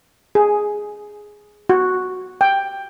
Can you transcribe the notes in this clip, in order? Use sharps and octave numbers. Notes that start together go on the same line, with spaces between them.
G#4
F#4
G5